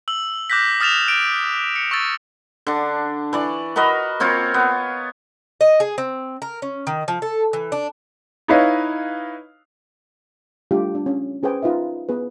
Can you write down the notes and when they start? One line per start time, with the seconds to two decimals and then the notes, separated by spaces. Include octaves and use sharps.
0.08 E6 F#7
0.50 D6 F#6 G6 A#6 B6
0.80 D#6 F6 A6 E7 F7
1.07 F#6 D7
1.76 C#7
1.91 C#6 E6 A6
2.67 D3 D4
3.33 E3 D5 C#6
3.76 F#4 A#4 B4 D#5
4.20 A#3 C4 F4 C#5
4.54 B3
5.61 D#5
5.80 G#4
5.98 C4
6.42 A#4
6.62 C#4
6.87 D#3
7.08 F3
7.22 A4
7.53 E3
7.72 D4
8.48 D#4 E4 B4 C#5 D#5 F5
10.71 G3 A3 D4 F4 G4
10.95 D4
11.06 C#4
11.43 C#4 G#4 B4 C5 G5 G#5
11.62 D#4 F4 B4 D#5 E5
12.09 B3 G#4 B4